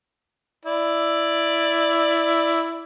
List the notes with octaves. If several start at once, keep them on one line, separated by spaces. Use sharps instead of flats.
E4 D5